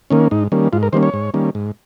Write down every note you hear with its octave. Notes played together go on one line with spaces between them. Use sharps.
D#3 A#3 C#4
G#2 D#4
D#3 G3 A#3 C#4
G#2 F4
A#4
D#3 G3 A#3 C#4 C5
C#5
G#2
D#3 G3 A#3 C#4
G#2